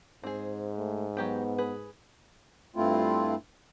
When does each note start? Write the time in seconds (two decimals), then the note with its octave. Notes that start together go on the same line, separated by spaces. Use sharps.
0.24 G#2 C4 G#4
0.77 A3
1.17 F#3 B3 G4 G5
1.58 G#4 B4
2.76 G2 A3 C4 E4 F4